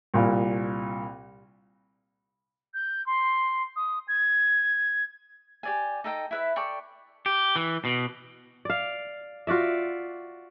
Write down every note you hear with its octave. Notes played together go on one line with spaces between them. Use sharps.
C2 A#2 F5
G6
C6
D#6
G#6
G4 D5 G#5
D#4 A4 D#5 G5
E4 B4 E5
A4 D5 G5 C#6
G4
E3
B2
D5 F5
F4 F#4 D5 E5